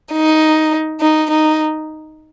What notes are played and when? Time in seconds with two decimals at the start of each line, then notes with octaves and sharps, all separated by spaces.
0.13 D#4
1.00 D#4
1.31 D#4